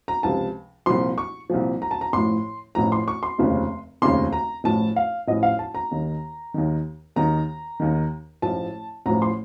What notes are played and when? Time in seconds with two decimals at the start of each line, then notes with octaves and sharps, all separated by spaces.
0.08 A#5
0.23 C#2 C3 F3 A5
0.86 C2 A#2 F3 C6
1.18 C#6
1.50 C2 A#2 F3
1.82 A#5
1.91 A5
2.01 A#5
2.13 A1 A2 F3 C6
2.75 A1 A2 F3 A#5
2.92 C6
3.08 C#6
3.23 C6
3.38 F1 D#2 C#3 F3
4.02 F1 D#2 C#3 F3 C6
4.33 A#5
4.64 A1 A2 F3 A5
4.96 F5
5.28 A1 A2 F3 D#5
5.43 F5
5.59 A5
5.75 A#5
5.91 D#2 D#3
6.54 D#2 D#3
7.16 D#2 D#3 A#5
7.80 D#2 D#3
8.42 A1 A2 F3 A5
9.06 A1 A2 F3 A#5
9.22 C6